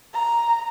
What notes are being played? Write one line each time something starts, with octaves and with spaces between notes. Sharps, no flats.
A#5